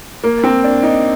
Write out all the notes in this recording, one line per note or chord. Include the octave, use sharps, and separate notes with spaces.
A#3
C4
D4
D#4